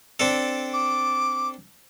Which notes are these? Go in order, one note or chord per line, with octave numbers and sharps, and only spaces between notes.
C4 D4 A4
D6